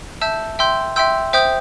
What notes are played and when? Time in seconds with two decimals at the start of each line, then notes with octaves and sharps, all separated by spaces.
0.21 E5 A5 E6 G6
0.59 E5 G5 C6 E6 G6
0.96 E5 G5 C6 E6 G6
1.33 C5 E5 G5 D#6 G6